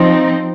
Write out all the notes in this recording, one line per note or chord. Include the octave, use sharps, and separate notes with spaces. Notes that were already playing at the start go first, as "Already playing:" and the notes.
Already playing: F3 C4 D#4